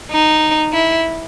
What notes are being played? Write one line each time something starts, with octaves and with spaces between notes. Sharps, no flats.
D#4
E4